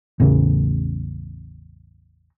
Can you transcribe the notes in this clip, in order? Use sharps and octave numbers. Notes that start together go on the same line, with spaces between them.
A1 E2 C#3